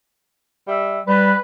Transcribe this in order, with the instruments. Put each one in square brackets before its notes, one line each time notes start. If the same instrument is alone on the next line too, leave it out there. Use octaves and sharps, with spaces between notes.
[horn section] G3 E5
[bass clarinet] G3 [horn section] B4